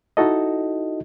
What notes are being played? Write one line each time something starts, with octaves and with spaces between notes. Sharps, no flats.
D#4 E4 F#4 A4 D#5